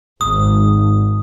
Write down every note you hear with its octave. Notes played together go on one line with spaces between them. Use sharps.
G#1 D#6